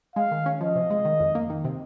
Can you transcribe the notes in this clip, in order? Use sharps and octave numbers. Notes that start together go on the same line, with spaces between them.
G#3 F5
D#3
C#4
F3 D#5
C3
G#3
D#3
F2
A#3
D#3
C3